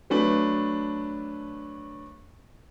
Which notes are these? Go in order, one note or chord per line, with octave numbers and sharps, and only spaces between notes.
F#3 A3 D4 B4